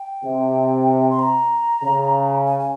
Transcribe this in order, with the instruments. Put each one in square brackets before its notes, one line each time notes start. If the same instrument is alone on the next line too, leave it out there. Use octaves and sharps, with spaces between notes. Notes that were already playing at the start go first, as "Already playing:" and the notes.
Already playing: [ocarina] G5
[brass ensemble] C3
[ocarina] C6
A#5
[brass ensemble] C#3
[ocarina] G#5
G#5